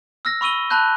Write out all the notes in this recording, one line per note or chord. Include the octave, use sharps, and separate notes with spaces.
E6 F6 A#6
B5 C#6 E6 D#7 G7
A5 B5 F#6 G6